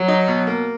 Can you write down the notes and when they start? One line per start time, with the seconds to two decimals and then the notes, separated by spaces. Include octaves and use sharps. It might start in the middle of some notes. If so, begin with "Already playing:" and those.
Already playing: F#3
0.08 D#4
0.28 B2
0.47 A#3